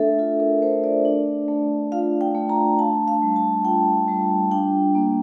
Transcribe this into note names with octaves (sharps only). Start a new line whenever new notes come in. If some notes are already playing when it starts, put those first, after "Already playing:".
Already playing: A3 D4 A4 E5
F4 A4
A#4
A3 C5
D5
D4
A3
F4 F5
G5
A3
A#5
D4 A5
F5
G3
A5
F4 G5
G3
D4 G5
A#3